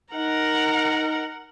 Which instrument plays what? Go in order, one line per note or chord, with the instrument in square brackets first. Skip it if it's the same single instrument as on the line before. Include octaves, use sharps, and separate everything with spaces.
[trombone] D#4 [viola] A#4 F#5